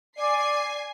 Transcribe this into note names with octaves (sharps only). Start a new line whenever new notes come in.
D5 G#5 C7